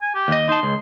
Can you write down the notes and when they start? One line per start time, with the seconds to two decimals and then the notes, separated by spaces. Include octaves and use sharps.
0.02 G#5
0.15 G4
0.28 D#2 D#5
0.49 D#4 A5 C6
0.63 C#2